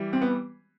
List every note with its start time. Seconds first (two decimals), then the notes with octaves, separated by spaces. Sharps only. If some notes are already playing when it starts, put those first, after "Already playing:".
Already playing: E3 G3
0.13 C4
0.22 B3